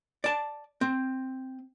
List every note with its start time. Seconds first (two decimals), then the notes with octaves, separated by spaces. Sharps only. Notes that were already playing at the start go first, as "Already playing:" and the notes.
0.24 D5 A5
0.81 C4